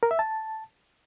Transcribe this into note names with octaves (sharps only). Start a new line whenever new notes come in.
A#4
E5
A5